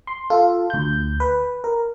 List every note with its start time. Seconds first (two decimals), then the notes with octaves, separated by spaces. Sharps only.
0.07 C6
0.30 F4 A4
0.70 D2 G6
1.20 B4
1.64 A#4